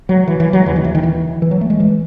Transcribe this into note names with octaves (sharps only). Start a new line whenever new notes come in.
F#3
E3
E3
F#3
D#2 C#3 E3
D#3
E3
D#3
E3
E3
F#3
A3
G#3
E3